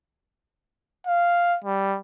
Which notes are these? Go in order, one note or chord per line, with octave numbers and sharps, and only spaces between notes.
F5
G3